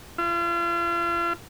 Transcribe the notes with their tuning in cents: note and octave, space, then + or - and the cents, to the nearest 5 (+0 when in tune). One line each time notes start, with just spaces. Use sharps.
F4 -40